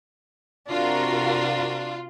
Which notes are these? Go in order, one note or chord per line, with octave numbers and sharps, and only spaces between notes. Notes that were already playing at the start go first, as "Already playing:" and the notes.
C3 D4 F4 F#4 A#4